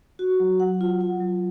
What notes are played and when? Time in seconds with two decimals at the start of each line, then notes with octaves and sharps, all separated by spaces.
0.19 F#4
0.40 F#3
0.60 F#5
0.81 F4
1.01 F4
1.21 F#3